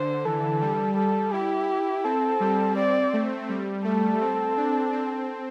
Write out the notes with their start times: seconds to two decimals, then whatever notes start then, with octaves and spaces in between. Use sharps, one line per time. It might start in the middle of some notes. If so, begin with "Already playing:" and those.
Already playing: D3 C5
0.25 E3 A4
0.61 G3
0.96 G3 A4
1.33 E4 G4
2.04 C4 A4
2.40 G3
2.77 C4 D5
3.13 A3
3.49 G3
3.84 A3 A4
4.21 C4
4.57 D4
4.93 C4